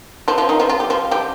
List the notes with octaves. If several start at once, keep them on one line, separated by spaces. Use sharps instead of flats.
F3 F4
F3 F4
D#3 D#4
F3 F4
F4
G4
F3 F4
G3 G4